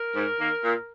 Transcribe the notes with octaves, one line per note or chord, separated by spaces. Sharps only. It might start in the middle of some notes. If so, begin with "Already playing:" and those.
Already playing: A#4
G#2
D#3 A#3
A#2